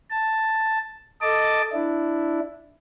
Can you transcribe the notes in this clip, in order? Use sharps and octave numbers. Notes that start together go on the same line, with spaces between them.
A5
A4 D#5 A5 D6
D4 E4